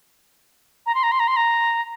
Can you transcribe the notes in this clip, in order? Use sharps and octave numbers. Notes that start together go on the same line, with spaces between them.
A#5
C6
A#5
C6
A#5
C6
A#5